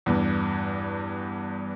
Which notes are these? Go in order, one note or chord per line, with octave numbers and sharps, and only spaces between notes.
E2 G2